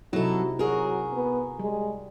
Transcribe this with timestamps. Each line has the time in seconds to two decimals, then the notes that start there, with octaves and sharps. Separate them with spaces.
0.13 C3 F#3 D#4 E4 F#4 A4
0.59 F#3 F#4 G#4 A#4
1.13 B3
1.59 G3 G#3